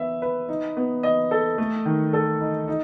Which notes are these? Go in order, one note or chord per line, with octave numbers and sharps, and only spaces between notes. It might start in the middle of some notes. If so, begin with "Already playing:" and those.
Already playing: B3 E5
B4
D#4
B3
D#5
A4
A3
D#3
A4
D#4
D#4